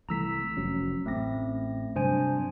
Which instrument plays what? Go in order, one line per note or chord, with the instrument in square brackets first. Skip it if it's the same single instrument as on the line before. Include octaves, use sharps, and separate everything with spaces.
[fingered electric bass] C2 E3 A3 [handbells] A#5 E6 B6
[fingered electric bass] F1 F#3 C#4
[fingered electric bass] A1 [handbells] A3 C4 A#6
[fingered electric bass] G2 C3 F#3 [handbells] D4 C5 G#5